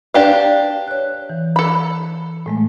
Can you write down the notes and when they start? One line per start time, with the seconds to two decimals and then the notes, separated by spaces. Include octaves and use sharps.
0.14 D4 G4 B4 F5
0.88 C#5 F#6
1.30 E3
1.56 A4 B5
2.46 A2 G#3 A3